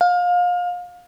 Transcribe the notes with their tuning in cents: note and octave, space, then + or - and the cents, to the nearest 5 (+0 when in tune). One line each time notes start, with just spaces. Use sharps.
F5 +30